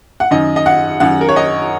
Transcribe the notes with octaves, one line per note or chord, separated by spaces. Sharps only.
F#5
F#2 D#3 D#5
D#5
F#5
F#2 D#3 F#5
A#4
C#5
D#5